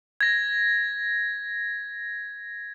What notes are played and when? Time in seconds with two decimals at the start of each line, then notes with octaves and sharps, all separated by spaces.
0.21 G#6 A#6